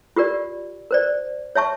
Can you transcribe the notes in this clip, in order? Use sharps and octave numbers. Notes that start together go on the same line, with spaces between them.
F4 G4 A#4 D5
A#4 C5 D5
C#5 E5 A5 C#6